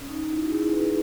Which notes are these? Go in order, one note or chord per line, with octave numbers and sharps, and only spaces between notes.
C#4
D#4
D#4
E4
F#4
E4 G#4
G#4 B4